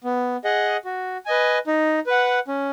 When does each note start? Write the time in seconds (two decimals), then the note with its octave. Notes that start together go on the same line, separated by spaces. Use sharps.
0.04 B3
0.44 G#4 D#5 F#5
0.85 F#4
1.26 B4 D#5 G#5
1.67 D#4
2.07 B4 F#5
2.48 C#4